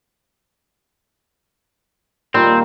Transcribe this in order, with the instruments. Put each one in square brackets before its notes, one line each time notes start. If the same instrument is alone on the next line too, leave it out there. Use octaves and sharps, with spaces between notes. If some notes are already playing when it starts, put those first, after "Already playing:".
[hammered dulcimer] A#2 D#3 G3 [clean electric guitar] C4